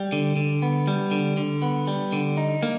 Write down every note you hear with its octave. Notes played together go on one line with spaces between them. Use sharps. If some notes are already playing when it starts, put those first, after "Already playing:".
Already playing: G3
D3
D3
B3
G3
D3
D3
B3
G3
D3
D#4
A#3